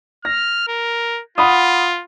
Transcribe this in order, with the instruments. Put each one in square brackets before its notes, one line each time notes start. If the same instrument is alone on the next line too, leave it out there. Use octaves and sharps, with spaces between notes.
[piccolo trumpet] F6 [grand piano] A#6
[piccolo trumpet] A#4
[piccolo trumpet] F4 [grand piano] F#5 B5 D#6